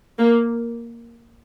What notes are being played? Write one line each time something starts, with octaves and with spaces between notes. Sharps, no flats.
A#3